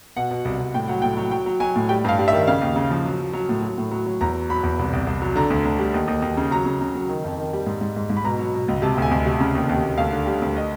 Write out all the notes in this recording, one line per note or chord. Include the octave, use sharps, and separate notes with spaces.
B2 F#5
B2
C2
C2
A2 G5
F#3 F#5
A2 G5
F#3
F#3 G5
F#3
F#3 G#5
A2
G3 G5
G2 F5
G3
E5
D#3
C#3 F5
D#2
C#3
F3
F#3
F#3
F#3
A2
F#3
A2
F#3
F#3
E2 A#5
F#3
F#3 B5
E2
C2
C2
C2
F#3
D3 A#5
D2
D2
G3
D#2
D#2
D#2
C#3
F#3 A#5
C#3
C#3
F#3
D#3
F2
D#3
G3
G#2
G#2
G#2
G#2
B5
B2 A#5
F#3
B2
C#2
C3 A5
D2 G#5
D2
C3
C#3
D#2
D#2
D#2
D2 F5
D3
G3
D2
D#5